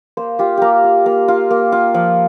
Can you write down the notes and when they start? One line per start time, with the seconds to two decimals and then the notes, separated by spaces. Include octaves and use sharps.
0.17 A#3 C5
0.39 F4 G4
0.57 A#3 G4 A#4
0.84 F4
1.06 A#3
1.28 F4
1.51 A#3
1.72 F4
1.94 F3